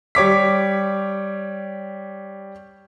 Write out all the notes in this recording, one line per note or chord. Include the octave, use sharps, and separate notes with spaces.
G3 C#5 D6 B6